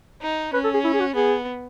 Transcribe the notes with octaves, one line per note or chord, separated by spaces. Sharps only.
D#4
C#4 B4
A4
G#4
E4
G#4
F#4
B3 G#4